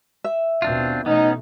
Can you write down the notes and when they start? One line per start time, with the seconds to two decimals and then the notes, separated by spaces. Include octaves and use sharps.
0.24 E5
0.62 D#2 B2 C4 D4 F4
1.06 B2 E3 A3 B3 C#4 D#4